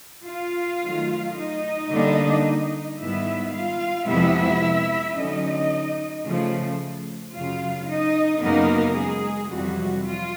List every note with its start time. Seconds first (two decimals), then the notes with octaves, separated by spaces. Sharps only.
0.28 F4 F5
0.83 D#3 F#3 A3
1.37 D#4 D#5
1.91 D3 G3 A#3 D4
3.00 G#2 D#3 G3 B3 E4 E5
3.54 F4 F5
4.08 F2 C3 F3 G#3 B3 E4 E5
5.16 D3 F#3 A3 C#4 D#4 D#5
6.25 C#3 F3 A3
7.33 F#2 C#3 F#3 F4 F5
7.88 D#4 D#5
8.42 F#2 C#3 F#3 A#3 B3 D#4 A#4
8.96 G#3 G#4
9.50 F2 C3 E3 F#3 G3 F#4
10.04 F4